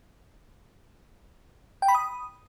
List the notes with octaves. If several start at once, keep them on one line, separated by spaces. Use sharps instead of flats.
G5
B5
D#6